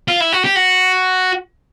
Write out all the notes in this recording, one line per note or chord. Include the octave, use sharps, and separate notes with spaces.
F4
E4
F#4
G4
F#4